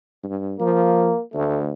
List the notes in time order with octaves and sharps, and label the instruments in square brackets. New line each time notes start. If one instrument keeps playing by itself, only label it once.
[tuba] G2
[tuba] F3 [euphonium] A#3
[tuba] D2 [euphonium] A3